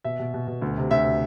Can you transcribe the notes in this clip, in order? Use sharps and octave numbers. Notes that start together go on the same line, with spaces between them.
B2 E5
B2
B2
B2
D2
C3
D2 E5